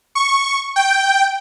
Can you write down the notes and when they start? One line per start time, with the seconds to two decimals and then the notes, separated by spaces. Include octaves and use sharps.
0.15 C#6
0.76 G5